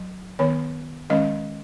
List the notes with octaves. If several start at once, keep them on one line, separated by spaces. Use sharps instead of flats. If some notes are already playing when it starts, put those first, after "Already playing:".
Already playing: F#3
D#3 B3 C#5
D#3 G#3 C#4 D#5